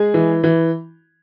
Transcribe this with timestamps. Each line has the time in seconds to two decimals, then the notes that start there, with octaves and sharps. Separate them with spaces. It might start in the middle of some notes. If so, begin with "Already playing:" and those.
Already playing: G#3 G#4 G#5
0.14 E3
0.44 E3